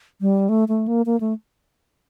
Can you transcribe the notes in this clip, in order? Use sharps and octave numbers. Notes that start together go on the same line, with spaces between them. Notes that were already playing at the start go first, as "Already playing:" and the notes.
G3
A3
A3
A#3
A#3
A3